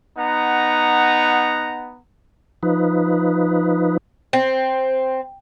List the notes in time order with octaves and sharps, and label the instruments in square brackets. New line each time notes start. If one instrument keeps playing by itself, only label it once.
[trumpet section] B3 D#4 F#5 A#5
[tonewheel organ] F3 D#4 B4
[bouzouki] C4